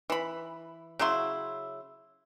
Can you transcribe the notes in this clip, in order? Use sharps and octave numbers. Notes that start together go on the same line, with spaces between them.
E3 B5
C#3 F#3 E4 C6